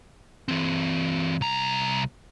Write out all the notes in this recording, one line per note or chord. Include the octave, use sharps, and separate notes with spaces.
E3 C4
C2 A#5